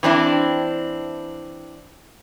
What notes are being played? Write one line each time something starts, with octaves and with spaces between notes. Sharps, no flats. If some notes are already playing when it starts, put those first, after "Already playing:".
E3 C4 D4 E4